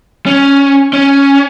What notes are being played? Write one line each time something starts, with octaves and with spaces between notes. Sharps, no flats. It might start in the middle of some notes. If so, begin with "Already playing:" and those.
C#4
C#4